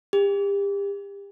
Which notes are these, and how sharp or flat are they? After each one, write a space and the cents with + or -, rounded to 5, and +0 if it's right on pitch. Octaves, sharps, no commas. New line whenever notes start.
G4 +35